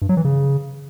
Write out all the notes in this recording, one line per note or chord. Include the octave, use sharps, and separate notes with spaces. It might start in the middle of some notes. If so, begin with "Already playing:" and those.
G2
F#3
E3
C#3